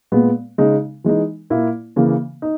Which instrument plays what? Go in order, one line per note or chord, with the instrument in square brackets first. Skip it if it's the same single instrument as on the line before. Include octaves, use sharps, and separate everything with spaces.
[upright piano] A#2 G#3 B3
C#3 G#3 D#4
E3 G#3 D#4
A#2 A#3 E4
C#3 E3 A#3
D#4